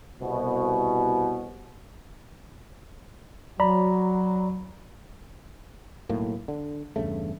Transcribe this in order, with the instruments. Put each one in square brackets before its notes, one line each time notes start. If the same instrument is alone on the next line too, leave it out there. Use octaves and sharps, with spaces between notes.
[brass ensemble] C2 B2
[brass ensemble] F#3 [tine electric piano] D5 A#5 B5
[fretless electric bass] B1 A2 A#3
D3
E2 G2 C#3 A3